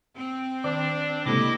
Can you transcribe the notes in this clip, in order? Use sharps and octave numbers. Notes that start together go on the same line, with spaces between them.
C4
D#3 D4 D5
C#2 A2 C3 A#3 E4 A4 D#5 D6